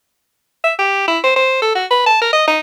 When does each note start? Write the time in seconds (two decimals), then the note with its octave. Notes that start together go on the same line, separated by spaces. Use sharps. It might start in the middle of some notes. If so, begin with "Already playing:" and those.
0.64 E5
0.79 G4
1.08 E4
1.24 C5
1.36 C5
1.62 A4
1.75 F#4
1.91 B4
2.06 A5
2.22 A#4
2.33 D#5
2.47 D#4